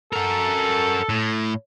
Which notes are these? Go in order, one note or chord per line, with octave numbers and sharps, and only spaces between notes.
F#4 A4 A#4
A2